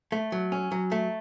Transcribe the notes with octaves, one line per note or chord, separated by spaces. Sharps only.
A3
F#3
C#4
F#3
A3